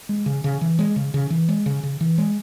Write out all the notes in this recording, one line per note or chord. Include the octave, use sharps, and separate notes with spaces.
G#3
C#3
C#3
E3
G#3
C#3
C#3
E3
G#3
C#3
C#3
E3
G#3